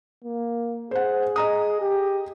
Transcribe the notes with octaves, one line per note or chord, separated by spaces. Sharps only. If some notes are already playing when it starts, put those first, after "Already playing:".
A#3
G#4 C5 F#5
D#5 A#5 D#6
G4